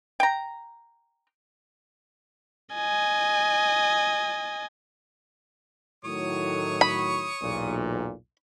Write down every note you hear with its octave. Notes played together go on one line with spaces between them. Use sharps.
G5 A#5
D#5 G#5
A2 D#3 F#3 C#5 C#6 D#6
B5
B1 E2 A#2